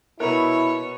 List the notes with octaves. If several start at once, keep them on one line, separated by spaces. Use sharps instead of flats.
B2 B3 E4 A#4 C#5